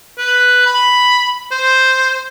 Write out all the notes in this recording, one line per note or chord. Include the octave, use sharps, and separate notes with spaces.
B4
B5
C5